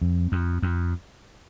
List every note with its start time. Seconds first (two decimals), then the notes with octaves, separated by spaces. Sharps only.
0.01 F2
0.32 F2
0.62 F2